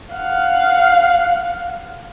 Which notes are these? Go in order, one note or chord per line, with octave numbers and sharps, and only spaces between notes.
F5 F#5